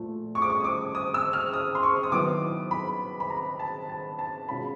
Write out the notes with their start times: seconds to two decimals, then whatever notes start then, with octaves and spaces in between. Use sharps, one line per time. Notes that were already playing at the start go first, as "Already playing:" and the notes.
Already playing: A#2 F3 A3
0.35 C#6
0.42 D6
0.50 C#6
0.60 D#6
0.64 D6
0.95 D#6
1.14 E6
1.33 F6
1.53 D#6
1.75 C6
1.83 C#6
2.03 D#6
2.12 D#3 F#3 B3 E4 D6
2.71 B5
3.20 B5
3.30 A#5
3.59 A5
3.89 A5
4.19 A5
4.48 B2 G#3 C#4 F4 B5